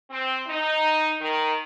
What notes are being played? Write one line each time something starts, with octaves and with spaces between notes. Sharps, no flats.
C4
D#4
D#3